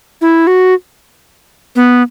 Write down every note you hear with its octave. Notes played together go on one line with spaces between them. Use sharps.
E4
F#4
B3